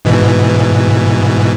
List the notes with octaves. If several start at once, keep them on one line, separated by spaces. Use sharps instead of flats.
G#2 B2 E3